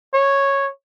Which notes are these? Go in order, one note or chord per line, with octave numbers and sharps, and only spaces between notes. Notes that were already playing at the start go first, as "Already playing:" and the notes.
C#5